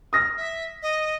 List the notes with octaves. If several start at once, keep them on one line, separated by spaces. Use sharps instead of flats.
D#6 F6 A#6
E5
D#5